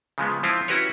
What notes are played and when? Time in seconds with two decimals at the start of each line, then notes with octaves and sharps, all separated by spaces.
0.18 C#3 F3 G#3 B3
0.43 F3 C4 E4 F4
0.68 C#4 E4 F#4 G4 B4 C#5